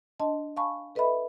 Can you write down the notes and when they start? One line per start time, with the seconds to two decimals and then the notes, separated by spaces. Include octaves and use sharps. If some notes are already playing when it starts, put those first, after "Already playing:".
0.19 D4 D#5 A5 C6
0.56 F5 G#5 A5 B5 C#6
0.95 A4 B4 D#5 E5 B5